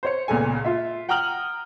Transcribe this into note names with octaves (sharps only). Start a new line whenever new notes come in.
C5 C#5 C#7
C#2 A#2 B3 A4 G#5
F4 E5
F#5 G5 A#5 D#6 F6 F#7